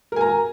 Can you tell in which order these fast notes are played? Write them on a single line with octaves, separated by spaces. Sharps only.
A#4 G#5 A#5